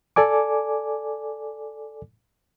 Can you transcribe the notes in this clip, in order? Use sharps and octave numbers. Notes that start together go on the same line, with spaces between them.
A4 D5 G#5 D6